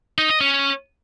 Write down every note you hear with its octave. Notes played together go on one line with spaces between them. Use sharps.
D#4
D#5
C#4